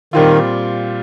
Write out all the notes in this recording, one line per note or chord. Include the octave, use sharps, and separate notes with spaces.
A#2 D#3 G3 C4 F4